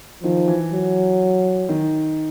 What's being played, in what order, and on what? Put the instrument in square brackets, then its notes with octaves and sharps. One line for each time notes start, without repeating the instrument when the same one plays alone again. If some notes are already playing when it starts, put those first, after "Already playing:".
[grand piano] D#3 [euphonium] F3
[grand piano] E3
[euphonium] F#3
[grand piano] D#3